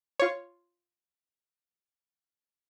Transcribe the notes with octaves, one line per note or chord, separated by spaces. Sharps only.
F4 C#5